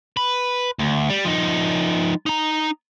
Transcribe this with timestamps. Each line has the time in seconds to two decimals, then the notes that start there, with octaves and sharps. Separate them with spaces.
0.17 B4
0.79 D2
1.09 G3
1.25 F3 D#4
2.26 D#4 A#5